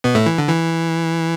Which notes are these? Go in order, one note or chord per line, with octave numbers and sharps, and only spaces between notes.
B2 B3
A2 A3
E3
D3
E3